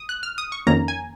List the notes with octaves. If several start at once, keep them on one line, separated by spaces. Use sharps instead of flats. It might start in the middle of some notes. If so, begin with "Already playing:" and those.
Already playing: D#6
F#6
F6
D#6
C#6
F2 D#3 A#3 C#4 A#5
G#5